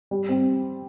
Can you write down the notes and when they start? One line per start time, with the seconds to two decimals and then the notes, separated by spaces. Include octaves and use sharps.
0.11 G3
0.29 C4